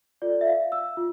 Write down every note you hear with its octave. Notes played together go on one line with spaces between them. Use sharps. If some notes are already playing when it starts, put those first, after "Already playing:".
F4 A4 D5
E5
F5
E6
F4